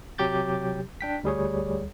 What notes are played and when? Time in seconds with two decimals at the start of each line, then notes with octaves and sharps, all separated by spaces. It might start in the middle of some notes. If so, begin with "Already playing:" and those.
0.18 C3 F#3 G4 D6 G6 A6
1.01 D4 G5 B6
1.24 D2 G3 G#4 C#5